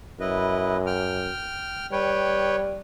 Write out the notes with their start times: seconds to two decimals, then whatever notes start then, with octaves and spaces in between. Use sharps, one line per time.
0.20 F#2 E4 B4 D#5
0.86 G5 F6
1.92 G3 B4 C#5 G5